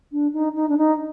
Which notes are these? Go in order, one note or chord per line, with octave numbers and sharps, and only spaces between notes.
D4
D#4
D#4
D4
D#4